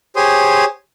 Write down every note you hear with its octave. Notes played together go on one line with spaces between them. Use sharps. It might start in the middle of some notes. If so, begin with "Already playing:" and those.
G4 G#4 C5 C#5 C6 D#6